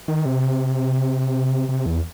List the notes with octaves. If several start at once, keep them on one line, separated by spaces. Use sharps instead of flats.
D#3
C3
C3
E2